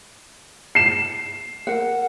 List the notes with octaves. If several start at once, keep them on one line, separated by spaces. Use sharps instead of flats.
C7 E7
A#4 F#5